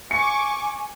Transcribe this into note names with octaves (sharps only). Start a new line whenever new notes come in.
G#5 C#6 D6 C#7